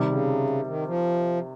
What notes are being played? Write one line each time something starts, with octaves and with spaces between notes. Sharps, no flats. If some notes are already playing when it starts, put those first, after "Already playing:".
Already playing: C3 D#3 G3
C#3
D#3
F3